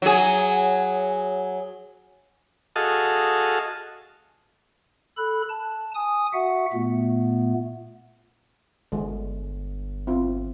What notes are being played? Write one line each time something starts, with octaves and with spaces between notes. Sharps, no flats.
F#3 G#4
F#4 G#4 A4 D#5 F5 A5
A4 B5 F#6
A5
G#5 D#6
F#4 E5 F#5
A#2 A3 B3
G1 D3 G#3
C4 F4